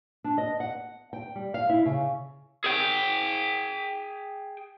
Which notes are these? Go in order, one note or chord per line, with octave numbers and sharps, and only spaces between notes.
D4
D#5
F#5
G5
G3
F5
E4
C#3
G#4 G5